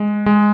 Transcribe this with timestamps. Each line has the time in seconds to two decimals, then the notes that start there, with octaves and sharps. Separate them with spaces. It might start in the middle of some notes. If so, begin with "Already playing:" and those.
Already playing: G#3
0.26 G#3